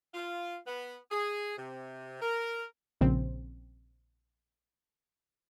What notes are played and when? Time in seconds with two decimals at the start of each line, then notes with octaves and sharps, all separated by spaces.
0.14 F4
0.67 B3
1.11 G#4
1.58 C3
2.21 A#4
3.01 A#1 C#3 C4